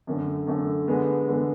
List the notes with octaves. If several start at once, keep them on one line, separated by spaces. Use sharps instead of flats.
F#2 D3 A3
F#2 D3 A3
D3 G#3 B3
D3 G#3 B3